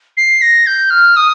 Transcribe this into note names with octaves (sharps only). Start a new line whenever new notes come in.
C7
A#6
G6
F6
D#6